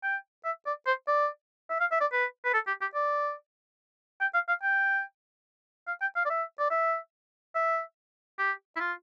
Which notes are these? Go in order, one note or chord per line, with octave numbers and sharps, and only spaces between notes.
G5
E5
D5
C5
D5
E5
F5
E5
D5
B4
B4
A4
G4
G4
D5
G5
F5
F5
G5
F5
G5
F5
D5
E5
D5
E5
E5
G4
E4
F4